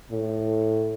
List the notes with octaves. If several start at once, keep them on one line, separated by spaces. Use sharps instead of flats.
A2